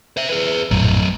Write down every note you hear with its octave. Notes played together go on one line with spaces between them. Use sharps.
C5 E5
G#4 B4
A#1 F#2 A2 F#3 A3